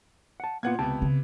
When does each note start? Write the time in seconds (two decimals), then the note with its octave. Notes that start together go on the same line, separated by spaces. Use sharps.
0.40 F#5 A5
0.63 A#2 A#3 B3 F4 F#5 G#6
0.79 C#2 C3 B3 G5 A5
1.02 C#3